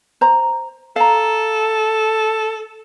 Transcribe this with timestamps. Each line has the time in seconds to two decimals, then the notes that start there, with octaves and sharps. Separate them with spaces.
0.21 C5 A#5
0.96 A4 F5 A#5